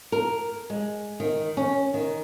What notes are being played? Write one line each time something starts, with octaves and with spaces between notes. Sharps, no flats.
A#4
G#3
D#3
C#4
D#3